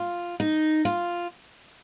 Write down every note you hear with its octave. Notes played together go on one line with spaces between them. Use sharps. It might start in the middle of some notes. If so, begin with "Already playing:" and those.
Already playing: F4
D#4
F4